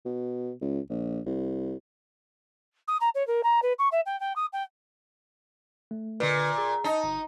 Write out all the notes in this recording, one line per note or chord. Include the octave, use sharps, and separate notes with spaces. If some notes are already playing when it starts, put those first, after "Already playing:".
B2
C#2
A#1
C2
D#6
A#5
C#5
A#4
A#5
B4
C#6
E5
G5
G5
D#6
G5
A3
A#2 D3 B4
G#4
D#4 A5 A#5
G1